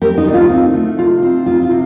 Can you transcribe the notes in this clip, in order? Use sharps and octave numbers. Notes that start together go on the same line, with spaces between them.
C4 G4 A#4
D#4
D2
F4
C4 D#4
A3
C3 F4
C4
D#4 F4
F4
C3